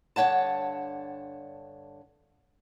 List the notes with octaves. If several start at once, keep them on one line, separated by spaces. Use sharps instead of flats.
G2 D3 C#5 F#5 A5